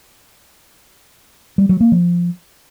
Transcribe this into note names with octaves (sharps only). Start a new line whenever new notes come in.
G3
F#3
A#3
F3